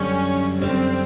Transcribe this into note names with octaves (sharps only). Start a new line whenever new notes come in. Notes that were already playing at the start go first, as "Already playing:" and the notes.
Already playing: F#2 D3 G3 C#4
F#2 D3 G3 C4